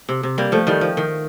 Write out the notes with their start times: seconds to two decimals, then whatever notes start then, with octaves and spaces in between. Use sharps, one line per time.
0.09 C3
0.23 C3
0.38 G3 A#3
0.52 F3 A3
0.67 D#3 G3
0.81 F3
0.97 D#3